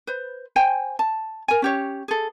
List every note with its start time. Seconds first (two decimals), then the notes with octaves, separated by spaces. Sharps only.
0.07 B4 C5
0.56 C5 G5 G#5
0.99 A5
1.48 A#4 G#5
1.62 C#4 G4 C#5
2.08 G#4 A4